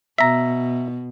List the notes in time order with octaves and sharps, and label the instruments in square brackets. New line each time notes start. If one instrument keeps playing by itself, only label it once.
[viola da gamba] B2 [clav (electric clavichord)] E5 A#5